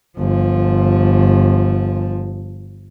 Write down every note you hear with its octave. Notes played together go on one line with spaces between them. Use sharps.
G1 F3